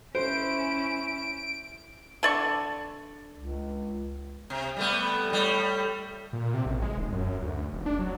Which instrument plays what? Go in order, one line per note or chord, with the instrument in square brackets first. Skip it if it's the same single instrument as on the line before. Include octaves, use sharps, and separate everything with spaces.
[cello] C#4 E4 [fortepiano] C5 [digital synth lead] D7
[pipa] D3 D5 C#6
[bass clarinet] C#2
[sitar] C3
G3 A3 B3
A2 G3
[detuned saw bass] A#2
C3
A1
G#3
D#1
F#2
D2
F1
D4
F#3